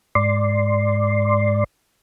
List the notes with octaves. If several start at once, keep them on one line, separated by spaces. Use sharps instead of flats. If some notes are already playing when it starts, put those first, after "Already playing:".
G#2 D5 C6